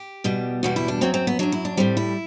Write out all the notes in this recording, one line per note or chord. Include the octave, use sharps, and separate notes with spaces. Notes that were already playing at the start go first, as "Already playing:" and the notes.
Already playing: G4
E2 B2 G3
E2 B2 G3 F#4
E4
D4
F#2 F#3 C4
C4
B3
F#2 F#3 D4
E4
D4
A2 G3 C4
E4